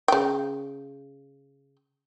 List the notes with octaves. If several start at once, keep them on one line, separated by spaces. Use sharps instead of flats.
C#3 G5